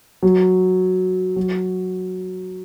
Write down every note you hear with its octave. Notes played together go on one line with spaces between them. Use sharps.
F#3
F#3